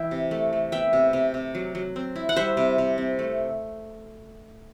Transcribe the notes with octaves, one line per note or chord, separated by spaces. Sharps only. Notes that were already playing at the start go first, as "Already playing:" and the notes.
Already playing: E3 E4 E5 G5
C3
A3
A3
B3 E5 G5
C3
C3
C3
F#3
F#3
C4
E4
F#5
G3 C5 E5
C3
C3
C4
A3